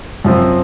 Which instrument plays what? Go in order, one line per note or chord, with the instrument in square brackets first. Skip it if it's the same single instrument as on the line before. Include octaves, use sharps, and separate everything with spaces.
[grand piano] F#2 F3 C4